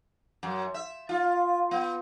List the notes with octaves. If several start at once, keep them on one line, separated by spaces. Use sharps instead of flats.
F#2
E5
F4
B3